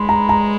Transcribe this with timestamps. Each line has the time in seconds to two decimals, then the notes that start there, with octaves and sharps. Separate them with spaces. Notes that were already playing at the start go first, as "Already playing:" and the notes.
Already playing: G#3 B5 C6
0.09 A#5
0.29 A#5